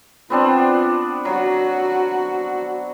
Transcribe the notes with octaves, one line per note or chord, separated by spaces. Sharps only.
B3 C4 D4 F4
F#3 F#4